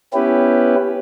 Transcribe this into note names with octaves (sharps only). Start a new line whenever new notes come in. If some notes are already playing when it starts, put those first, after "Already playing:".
B3 C#4 E4 G4 B4